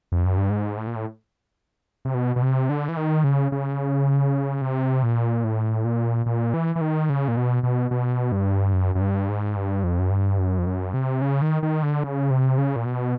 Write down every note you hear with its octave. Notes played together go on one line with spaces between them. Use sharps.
F2
F#2
G2
G#2
A2
A#2
A2
C3
B2
B2
C3
D3
E3
D#3
C#3
C#3
C3
A#2
A2
A#2
A#2
E3
E3
D#3
C#3
A#2
B2
B2
B2
G2
F#2
F#2
G2
G#2
G2
F2
F#2
G2
F#2
F2
F#2
C3
C#3
D#3
D#3
D3
C#3
C3
C#3
A#2
B2